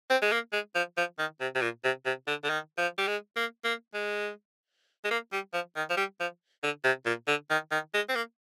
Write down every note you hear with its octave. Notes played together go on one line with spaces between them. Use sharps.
C4
G#3
A#3
G#3
F3
F3
D#3
C3
C3
A#2
C3
C3
D3
D3
D#3
F3
G3
G#3
A#3
A#3
G#3
G#3
A#3
G3
F3
D#3
F3
G3
F3
D3
C3
A#2
D3
D#3
D#3
G#3
C4
A#3